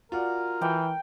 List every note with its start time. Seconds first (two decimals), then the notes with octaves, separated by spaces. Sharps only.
0.12 F4 F#4 A#4 D5
0.61 E3 G5